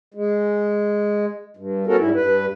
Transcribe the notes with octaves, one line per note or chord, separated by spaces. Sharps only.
G#3
G2
B3 C#4 F#4 A4 A#4
G#2 G3 E4
G2 B4